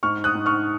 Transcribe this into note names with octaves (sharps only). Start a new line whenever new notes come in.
G#2 C#6 F6
D#6 F#6
G#2
C#6 F6